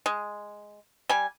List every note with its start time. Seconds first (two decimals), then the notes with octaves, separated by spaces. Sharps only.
0.06 G#3
1.09 G3 G#5